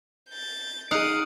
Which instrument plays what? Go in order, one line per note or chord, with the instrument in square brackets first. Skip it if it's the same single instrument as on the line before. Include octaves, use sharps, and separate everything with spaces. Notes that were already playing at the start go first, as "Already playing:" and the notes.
[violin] G6 A6
[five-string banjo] D#4 G#4 [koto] F5 F#5 [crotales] D#6 F7 [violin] D7 D#7